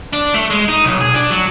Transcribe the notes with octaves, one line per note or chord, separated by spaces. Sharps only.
D4
A3
G#3
D#4
B1
G#4
D4
F#3